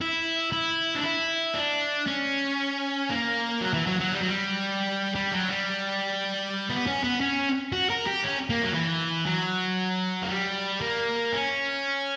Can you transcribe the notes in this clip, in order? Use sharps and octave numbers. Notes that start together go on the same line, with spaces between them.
E4
E4
D4
E4
D4
C#4
A#3
F#3
E3
F#3
F#3
G3
F#3
G3
G3
F#3
G3
B3
C#4
B3
C#4
F#4
A#4
G4
C#4
A#3
F#3
E3
F#3
A#3
G3
A#3
C#4